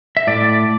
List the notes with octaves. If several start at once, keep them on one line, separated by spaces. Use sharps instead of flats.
E5
A2 D5